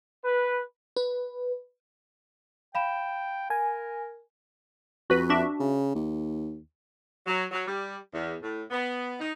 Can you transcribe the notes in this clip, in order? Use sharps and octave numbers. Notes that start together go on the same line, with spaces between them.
B4
B4
F5 G5 B5 E7
A#4 G#5
F2 F#4 B4
D4 F#4 E5
C#3
D#2
F#3
F#3
G3
E2
A2
B3
D#4